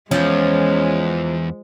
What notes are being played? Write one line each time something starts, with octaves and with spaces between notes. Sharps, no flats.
E2 F3 G#3 C#4